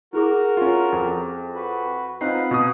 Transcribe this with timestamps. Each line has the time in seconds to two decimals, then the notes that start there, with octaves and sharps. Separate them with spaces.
0.13 E4 F#4 G#4 A#4 D6
0.57 C#4 F4
0.92 F2
1.55 F#4 B4
2.21 C4 D#4 F4 B4 F#5 F#6 C7
2.51 B2 D#6